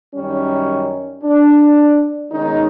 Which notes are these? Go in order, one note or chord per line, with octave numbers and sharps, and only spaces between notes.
F#2 D#3 G3 C#4
D4
B2 D#3 G#3 C#4 D#4